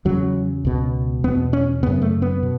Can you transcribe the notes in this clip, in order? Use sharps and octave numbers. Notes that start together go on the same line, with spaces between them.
E2 C#3 F#3
C#2 B2
E2 B2 B3
C#4
F#2 C#3 B3
A3
B3
B2